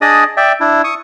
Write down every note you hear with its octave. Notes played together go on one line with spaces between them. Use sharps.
D4 G#4 D5 D#5 D#6
D5 E5 G5
D4 E4
C#6 D#6